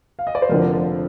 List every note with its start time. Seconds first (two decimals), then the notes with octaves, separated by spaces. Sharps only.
0.19 F5
0.27 D#5
0.35 D5
0.42 C5
0.49 F1 F2 D3 F3 A#4